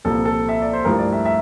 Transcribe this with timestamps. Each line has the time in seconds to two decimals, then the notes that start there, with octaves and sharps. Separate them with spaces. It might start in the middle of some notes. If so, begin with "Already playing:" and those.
0.04 C2 A#2 F3 A4
0.25 A4
0.49 E5
0.62 D5
0.73 C5
0.85 G2 F3 A3 E4 A#4
0.98 D5
1.13 E5
1.26 E5